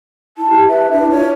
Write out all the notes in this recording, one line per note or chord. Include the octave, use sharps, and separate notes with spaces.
E4 A5
G4
B4 E5
D4 E4
F4 C#5